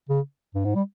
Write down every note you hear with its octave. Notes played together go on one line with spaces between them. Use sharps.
C#3
G2
G#2
G3